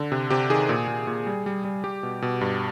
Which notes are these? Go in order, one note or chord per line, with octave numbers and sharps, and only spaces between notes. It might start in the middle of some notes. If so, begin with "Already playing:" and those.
Already playing: D3
C3
C3 G4
D#3 G#4
A#2
A#2
A#2
G3
G3
G3
G3 G4
B2
B2
G2